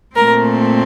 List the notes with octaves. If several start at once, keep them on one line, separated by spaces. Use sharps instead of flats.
A#2 A3 C4 A#4